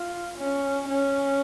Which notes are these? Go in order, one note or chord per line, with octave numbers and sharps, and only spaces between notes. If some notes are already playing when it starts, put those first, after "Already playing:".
Already playing: F4
C#4
C#4